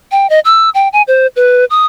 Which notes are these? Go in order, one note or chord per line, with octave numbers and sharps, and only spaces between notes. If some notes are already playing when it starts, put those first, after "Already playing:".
G5
D#5
E6
G5
G#5
C5
B4
D#6